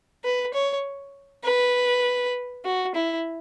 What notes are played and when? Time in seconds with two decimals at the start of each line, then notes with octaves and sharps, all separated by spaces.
0.24 B4
0.54 C#5
1.44 B4
2.65 F#4
2.95 E4